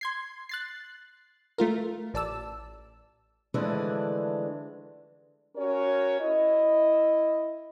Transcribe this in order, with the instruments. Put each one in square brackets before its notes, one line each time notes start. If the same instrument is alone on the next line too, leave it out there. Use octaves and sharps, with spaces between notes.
[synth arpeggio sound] C6 G#6 C7
F#6 A6 C7
A3 F4 A#4
A1 D5 A5 E6
[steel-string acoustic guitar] D3 E3 F3 G#3 A3 D4
[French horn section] C#4 F#4 A#4 C#5
E4 D#5